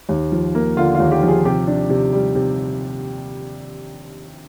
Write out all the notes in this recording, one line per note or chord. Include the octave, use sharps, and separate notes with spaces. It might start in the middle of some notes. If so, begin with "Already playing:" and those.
D#2
F3
A#3
D3 F4
D#2 F4
G4
F3 G#4
C3 G4
D4
C3
G3
C3